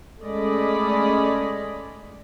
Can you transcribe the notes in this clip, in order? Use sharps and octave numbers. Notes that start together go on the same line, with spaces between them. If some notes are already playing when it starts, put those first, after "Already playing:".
G#3 A3 C#4 D5 D#5 B5